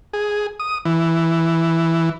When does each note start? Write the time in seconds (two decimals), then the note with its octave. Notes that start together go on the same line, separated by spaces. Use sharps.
0.13 G#4
0.60 D#6
0.85 E3